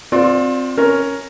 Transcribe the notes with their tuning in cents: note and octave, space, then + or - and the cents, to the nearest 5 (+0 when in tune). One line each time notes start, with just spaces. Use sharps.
C4 +0 F4 +30 D5 +0
C#4 +0 A#4 +0